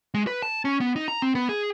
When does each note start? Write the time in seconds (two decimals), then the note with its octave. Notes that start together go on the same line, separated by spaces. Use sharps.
0.14 G#3
0.27 B4
0.42 A5
0.65 C#4
0.80 B3
0.96 D#4
1.08 A#5
1.22 C4
1.35 B3
1.49 G#4